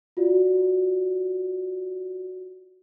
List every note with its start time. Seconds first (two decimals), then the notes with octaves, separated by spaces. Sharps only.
0.17 F4 F#4 D5